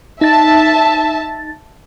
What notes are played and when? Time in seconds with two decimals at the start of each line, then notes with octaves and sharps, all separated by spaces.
0.21 D#4 E5 A5 A6